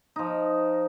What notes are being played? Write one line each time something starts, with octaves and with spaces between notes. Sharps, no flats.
F3 D#4